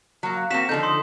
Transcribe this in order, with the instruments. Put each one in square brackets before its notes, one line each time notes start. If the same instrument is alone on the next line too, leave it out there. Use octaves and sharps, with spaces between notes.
[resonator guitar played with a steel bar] F#3 A#3
[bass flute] F5
[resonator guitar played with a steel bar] A#3 C4 F#4 [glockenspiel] B6 E7
[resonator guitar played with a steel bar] D3 F3 D#4 [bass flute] A4 [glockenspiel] G6
[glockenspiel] C6 D#6